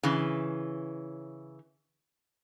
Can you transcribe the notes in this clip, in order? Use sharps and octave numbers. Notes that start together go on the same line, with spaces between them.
C#3 E3